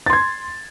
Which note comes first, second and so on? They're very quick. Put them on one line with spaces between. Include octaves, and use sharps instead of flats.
A6 C6 G#6